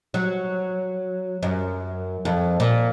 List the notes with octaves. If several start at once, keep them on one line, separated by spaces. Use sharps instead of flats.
F#3
F#2
F2
A#2